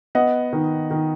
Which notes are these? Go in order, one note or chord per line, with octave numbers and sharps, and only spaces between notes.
B3 D#5 F#5
D#3
D#3